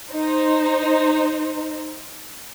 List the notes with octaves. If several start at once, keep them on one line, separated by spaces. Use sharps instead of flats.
D#4 C5